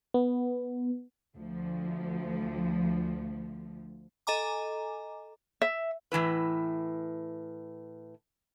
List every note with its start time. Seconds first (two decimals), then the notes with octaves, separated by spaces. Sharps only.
0.14 B3
1.35 D2 F3
4.27 A4 D#5 G#5 A#5 D6
5.62 E5
6.12 A2 E3 E4 B4